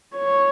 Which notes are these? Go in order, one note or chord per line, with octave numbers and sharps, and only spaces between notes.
C#5